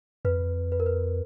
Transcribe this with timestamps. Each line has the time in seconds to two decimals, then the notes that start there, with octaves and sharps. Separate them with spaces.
0.25 F2 B4
0.72 B4
0.80 A#4
0.86 B4